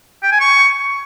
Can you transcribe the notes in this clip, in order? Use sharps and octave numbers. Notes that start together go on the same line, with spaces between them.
G5
G#5
C#6